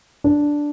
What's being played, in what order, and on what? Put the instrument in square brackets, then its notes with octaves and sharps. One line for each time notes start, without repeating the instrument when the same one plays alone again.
[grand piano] D4